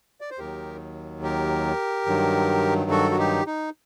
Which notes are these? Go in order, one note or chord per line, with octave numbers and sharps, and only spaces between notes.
D5
C5
D#2 D#3 F#3 G4 A#4
G4 A#4
G2 D#3 F#3
F#4 A4
F#4
D#4 G4
D#4